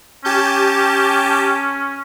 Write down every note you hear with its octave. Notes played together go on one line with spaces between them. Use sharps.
C#4 G4 A5 G6